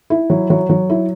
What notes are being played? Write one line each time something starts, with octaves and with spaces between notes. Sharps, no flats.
E4
F#3
F#3
F#3
E4